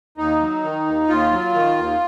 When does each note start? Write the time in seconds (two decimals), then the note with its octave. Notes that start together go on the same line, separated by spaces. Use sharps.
0.17 D#2 D#4
0.41 F#3
0.63 D#3
0.86 D#2
1.08 D#2 F4
1.32 F#3
1.54 D#3
1.78 D#2